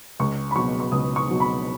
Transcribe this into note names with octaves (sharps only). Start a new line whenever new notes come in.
C#2 C#6
B5
B2 F#3 C#6
C#6
C#2 D#6
C#6
B2 F#3
B5